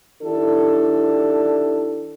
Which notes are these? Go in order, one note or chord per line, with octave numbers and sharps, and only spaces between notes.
D#3 D4 E4 G4 A4